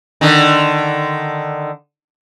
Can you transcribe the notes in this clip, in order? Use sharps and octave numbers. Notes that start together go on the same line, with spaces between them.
D3 D#3